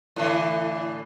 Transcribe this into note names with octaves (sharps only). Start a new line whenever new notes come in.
A2 D3 E3